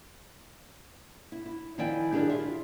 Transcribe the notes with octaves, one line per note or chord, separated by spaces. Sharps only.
E4
E4
D#3 F3 E4 D5 G5 G#5
D4 G4 G#4 A#4 D5
E4 F4 E5